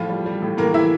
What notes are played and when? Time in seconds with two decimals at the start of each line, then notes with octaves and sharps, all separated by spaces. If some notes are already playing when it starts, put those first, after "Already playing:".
Already playing: A2 F3 F4
0.09 G3
0.26 G3
0.42 A2
0.58 A2 A#3 A#4
0.74 E3 E4 E5